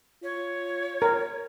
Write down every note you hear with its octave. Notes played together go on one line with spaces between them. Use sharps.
F4 C#5
A#4